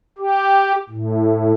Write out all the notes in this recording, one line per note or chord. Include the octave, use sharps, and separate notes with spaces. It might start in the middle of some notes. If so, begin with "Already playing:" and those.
G4
A2